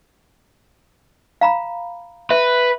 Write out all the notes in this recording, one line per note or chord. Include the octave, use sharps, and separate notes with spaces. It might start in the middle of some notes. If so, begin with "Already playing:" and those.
F5 A#5 B5
B4 E5